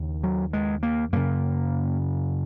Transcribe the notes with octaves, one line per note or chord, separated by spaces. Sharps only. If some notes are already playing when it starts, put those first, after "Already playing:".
Already playing: D#2 C#3
F#3
G#3
A#3
F#2 C#3 A#3